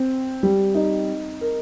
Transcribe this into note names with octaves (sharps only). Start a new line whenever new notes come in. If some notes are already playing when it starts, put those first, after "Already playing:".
Already playing: C4
G3
D#4
A#4